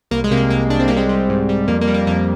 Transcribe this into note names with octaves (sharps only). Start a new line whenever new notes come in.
C2 A#3
G#3
C3 A#3
G#3
C2 A#3
C2 D4
C4
G3 A#3
G#3 C4
G3
G#2
G3
F2 A#3
A#3
G3
A#3
F2 A#3